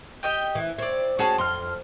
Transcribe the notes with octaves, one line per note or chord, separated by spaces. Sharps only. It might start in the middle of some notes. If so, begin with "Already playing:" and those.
G4 D#5 G5
E3
C4 C#5 D5
C#4 F#4 G#4 C#5 A5
F2 C6 F6